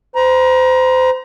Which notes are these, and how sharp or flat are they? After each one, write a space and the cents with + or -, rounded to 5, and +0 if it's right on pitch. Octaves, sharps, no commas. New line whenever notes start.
C5 -30 A#5 +30